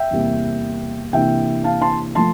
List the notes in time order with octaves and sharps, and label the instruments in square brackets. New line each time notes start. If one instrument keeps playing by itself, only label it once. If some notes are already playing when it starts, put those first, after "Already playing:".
Already playing: [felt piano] E5 G5
E2 C3 G3 A#3
C3 E3 A#3 D4 E5 G5
F5 A5
A5 C6
F3 A3 A5 C6